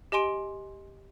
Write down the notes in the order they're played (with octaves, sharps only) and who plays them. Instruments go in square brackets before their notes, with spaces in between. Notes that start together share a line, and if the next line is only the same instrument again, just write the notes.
[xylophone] G4 D#5 G#5 C6 D7